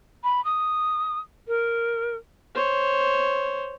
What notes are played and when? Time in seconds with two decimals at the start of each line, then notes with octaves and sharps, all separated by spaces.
0.24 B5
0.45 D#6
1.48 A#4
2.55 C5 C#5